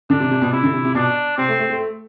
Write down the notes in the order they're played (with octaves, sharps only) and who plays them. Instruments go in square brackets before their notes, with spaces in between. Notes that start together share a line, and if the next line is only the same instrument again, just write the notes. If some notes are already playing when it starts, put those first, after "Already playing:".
[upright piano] D3 [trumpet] D4
[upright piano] C3
C3
B2
[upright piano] C3 [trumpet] E4
[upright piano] D3
C3
C3
[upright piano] B2 [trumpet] D4
[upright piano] C3 [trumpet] C4
[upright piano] A3
A3
A3